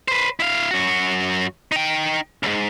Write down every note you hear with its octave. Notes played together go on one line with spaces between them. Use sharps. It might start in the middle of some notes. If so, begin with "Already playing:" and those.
B4 C5
E4 F5
F#2 F#4
D#4 G5
C#2 G#2